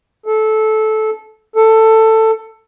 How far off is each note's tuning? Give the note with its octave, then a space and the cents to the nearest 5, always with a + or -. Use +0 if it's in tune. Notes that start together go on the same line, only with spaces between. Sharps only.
A4 -15
A4 +15